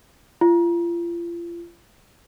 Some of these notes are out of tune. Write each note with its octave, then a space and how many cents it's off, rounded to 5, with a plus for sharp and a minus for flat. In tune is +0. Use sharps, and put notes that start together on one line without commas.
F4 -35